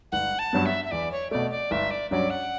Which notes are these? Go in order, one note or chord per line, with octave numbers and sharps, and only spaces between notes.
G1 F#5
A5
G2 F#3 B3
E5
E5
E2 D5
C#5
B2 A3 D5
D5
G1 E5
D5
G2 F#3 C#4 D5
F#5